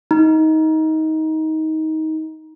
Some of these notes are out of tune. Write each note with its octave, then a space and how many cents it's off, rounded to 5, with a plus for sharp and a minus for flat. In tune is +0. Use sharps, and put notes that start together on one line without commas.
D#4 +20